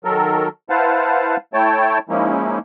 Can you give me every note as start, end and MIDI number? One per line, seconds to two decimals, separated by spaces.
0.05 0.48 51
0.05 0.48 54
0.05 0.48 69
0.05 0.48 70
0.70 1.37 64
0.70 1.37 71
0.70 1.37 72
0.70 1.37 77
0.70 1.37 78
0.70 1.37 81
1.54 1.98 57
1.54 1.98 64
1.54 1.98 73
1.54 1.98 79
1.54 1.98 81
2.09 2.58 53
2.09 2.58 56
2.09 2.58 58
2.09 2.58 61
2.09 2.58 63
2.09 2.58 64